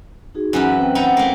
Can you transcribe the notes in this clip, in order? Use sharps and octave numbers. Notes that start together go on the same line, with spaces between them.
D#4 F#4 G#4
F#2 E3 B4
C4 C5 G5
B3 D#4 E4
A3 A#3